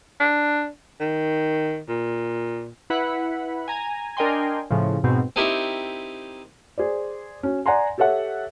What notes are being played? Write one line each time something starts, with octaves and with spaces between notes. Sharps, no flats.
D4
D#3
A#2
E4 B4 F#5 B5
G#5 A#5
D4 A#4 D#5 G5 G#5 C6
A2 C#3 F3
G#2 B2 C4
C4 D#4 E4 G4 A#4 E5
G#4 C5 D5
C#4 F#4
D5 F#5 G#5 A#5 C6
G4 A4 C#5 E5 F#5